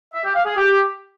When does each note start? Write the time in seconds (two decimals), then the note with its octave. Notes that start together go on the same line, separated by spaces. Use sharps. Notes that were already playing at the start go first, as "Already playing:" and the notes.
0.14 E5
0.25 G4
0.35 F5
0.46 G#4
0.57 G4